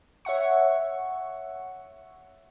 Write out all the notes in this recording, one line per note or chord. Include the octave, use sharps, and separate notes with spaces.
C#5 E5 F#5 C#6